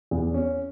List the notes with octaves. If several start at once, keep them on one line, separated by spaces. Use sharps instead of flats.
E2
C#4